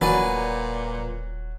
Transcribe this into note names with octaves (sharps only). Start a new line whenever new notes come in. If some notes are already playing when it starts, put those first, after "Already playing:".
D#1 A#2 F#3 B4 D5 G#5